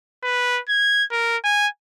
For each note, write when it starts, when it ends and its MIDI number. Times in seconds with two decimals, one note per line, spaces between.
0.24 0.60 71
0.69 1.04 92
1.11 1.37 70
1.44 1.67 80